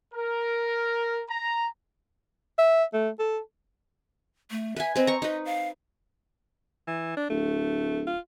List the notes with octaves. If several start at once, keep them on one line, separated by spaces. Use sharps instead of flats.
A#4
A#5
E5
A3
A4
A3
B4 E5 G#5
C4 B4 D#5
A#5 C#6
D#4 B4 D#5
F5
E3
D4
D1 A3
F4